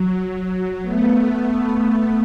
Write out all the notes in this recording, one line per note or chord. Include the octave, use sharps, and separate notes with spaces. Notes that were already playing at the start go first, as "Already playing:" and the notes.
Already playing: F#3
A3 B3